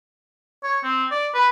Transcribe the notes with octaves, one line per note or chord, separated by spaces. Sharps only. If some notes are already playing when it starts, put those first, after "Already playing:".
C#5
C4
D5
B4